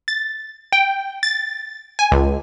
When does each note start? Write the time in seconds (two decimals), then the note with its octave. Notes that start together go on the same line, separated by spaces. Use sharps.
0.08 A6
0.72 G5
1.23 A6
1.99 G#5
2.12 C#2